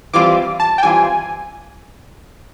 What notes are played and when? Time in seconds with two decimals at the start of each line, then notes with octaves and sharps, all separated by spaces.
0.13 E3 G3 C4 F4 D6
0.60 A5
0.78 G5
0.83 E3 G3 C4 F4 G#5